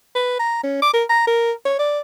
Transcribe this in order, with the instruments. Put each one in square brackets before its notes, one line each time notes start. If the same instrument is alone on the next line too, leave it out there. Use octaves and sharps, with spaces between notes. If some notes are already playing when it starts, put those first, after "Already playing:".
[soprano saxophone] B4
A#5
C#4
D6
A#4
A#5
A#4
C#5
D5